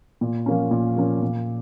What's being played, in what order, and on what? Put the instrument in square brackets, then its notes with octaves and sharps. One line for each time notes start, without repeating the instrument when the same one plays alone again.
[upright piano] A#2
F3 A#3 C#4
A#2
F3 A#3 C#4
A#2